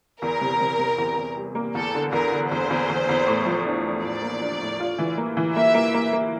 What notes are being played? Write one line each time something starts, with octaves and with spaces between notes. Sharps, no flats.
E2 A#4
C3
C3
C3
E2
E2
G3
A#3
E2 A4
D3
E2 A#4
D3
E2 C5
E2
E2
E2
A2
F3
D4
D4
A2 D5
A#3
D4
A2
F4
E3
A#3
E3
A#3 E5
A#3
A#3
A#3